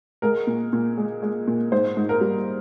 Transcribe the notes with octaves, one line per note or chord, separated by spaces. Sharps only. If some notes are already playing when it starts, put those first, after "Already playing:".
G#3 A#4
A#2
A#2
G#3
G#3
A#2
G#2 C5
G#2
A#4
G3